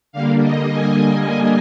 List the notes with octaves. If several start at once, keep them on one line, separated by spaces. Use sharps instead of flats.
D3 G3 A#3 F5
D#5
G#5